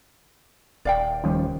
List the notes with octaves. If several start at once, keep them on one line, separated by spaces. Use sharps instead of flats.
D#1 D5 F5 G5
D#2 F3 G3 C#4